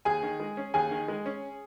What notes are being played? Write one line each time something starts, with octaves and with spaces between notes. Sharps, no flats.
D#2 G#4 G#5
D#3
G#3
C#4
D#2 G#4 G#5
D#3
G#3
C#4